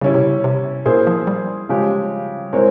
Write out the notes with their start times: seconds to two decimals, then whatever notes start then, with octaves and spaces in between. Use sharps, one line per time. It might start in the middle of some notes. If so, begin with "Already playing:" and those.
0.01 C#3 G3 C#4 E4
0.14 C3
0.23 C#3
0.44 C3
0.86 A#2 A#3 E4 G#4 C5
1.07 F3
1.27 G3
1.69 C#3 F3 G#3 C#4 G4
2.53 G#3 C4 E4 A#4 C#5